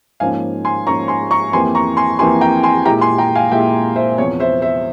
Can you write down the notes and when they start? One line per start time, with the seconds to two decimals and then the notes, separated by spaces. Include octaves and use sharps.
0.20 G#2 F3 A#3 C#4 F5 G#5
0.65 G#5 C6
0.87 G#2 F3 A#3 C#4 A#5 C#6
1.08 G#5 C6
1.31 A#5 C#6
1.53 F2 E3 A#3 E4 G4 G#5 C6
1.75 A#5 C#6
1.97 G#5 C6
2.19 F2 E3 A#3 E4 G4 G#5 C6
2.41 G5 A#5
2.63 G#5 C6
2.85 A#2 G#3 E4 G4 G5 A#5
3.01 G#5 C6
3.18 G5 A#5
3.35 F5 G#5
3.52 A#2 G#3 E4 G4 E5 G5
3.96 C5 E5
4.18 E2 C3 F3 C#5
4.40 C5 E5
4.62 C5 E5